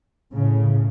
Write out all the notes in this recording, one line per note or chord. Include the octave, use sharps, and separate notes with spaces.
A2 C#3